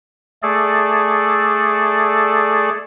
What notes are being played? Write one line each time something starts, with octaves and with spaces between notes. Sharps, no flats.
A3 G#4 A4 D5